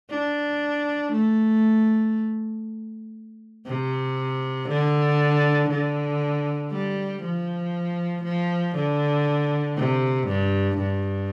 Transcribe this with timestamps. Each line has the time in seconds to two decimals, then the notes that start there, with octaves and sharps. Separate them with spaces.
0.10 D4
1.12 A3
3.66 C3
4.69 D3
5.69 D3
6.71 G3
7.22 F3
8.24 F3
8.75 D3
9.77 C3
10.27 G2
10.78 G2